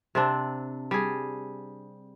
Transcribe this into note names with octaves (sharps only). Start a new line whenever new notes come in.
C3 C4 D4
G3 G#4